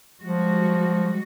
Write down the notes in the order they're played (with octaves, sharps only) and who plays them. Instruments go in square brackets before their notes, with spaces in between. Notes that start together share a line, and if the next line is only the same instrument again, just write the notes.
[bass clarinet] F3 [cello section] G3 G#3 F#4